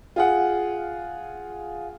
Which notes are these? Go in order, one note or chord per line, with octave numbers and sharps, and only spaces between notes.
F4 G#4 F#5